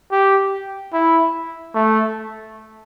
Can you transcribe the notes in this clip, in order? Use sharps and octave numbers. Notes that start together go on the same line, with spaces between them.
G4
E4
A3